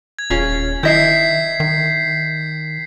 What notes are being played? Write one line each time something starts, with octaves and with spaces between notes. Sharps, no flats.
G#6
D#1 C#4 F4 G#4
D#3 E4 D#5 E5 G6 B6 C7
D#3